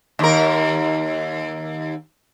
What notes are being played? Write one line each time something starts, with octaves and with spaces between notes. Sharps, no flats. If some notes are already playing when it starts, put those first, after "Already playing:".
D#2 A#4